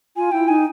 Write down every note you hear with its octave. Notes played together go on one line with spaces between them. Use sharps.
F4 G#5
E4 G5
D#4 G#5